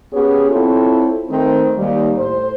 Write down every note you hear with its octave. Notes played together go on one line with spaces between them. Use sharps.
B3 C#4 G4 G#4 C#5
C4 E4 F4 A4 C#5
D#3 A3 C4
D#2 G3
A2 C5